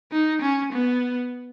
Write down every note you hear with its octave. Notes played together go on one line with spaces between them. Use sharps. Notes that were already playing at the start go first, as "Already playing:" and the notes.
D#4
C#4
B3